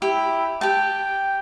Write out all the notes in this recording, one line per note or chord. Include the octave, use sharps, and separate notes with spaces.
E4 G4
G4 G5 A5